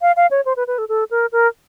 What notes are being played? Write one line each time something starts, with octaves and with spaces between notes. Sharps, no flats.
F5
F5
C#5
C5
B4
B4
A4
A4
A#4
A#4